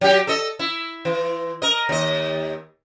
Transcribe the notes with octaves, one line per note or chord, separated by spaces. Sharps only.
F#3 G4
A4 D#5
E4
E3
A#4 D#5
D#2 D#5